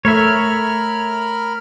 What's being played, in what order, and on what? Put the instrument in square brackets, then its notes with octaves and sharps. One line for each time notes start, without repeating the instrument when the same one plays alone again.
[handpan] A3 [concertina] A#4 B5 F6 [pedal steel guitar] C#5 E5